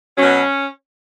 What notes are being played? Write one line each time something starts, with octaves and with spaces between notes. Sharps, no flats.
B2 F#3 C#4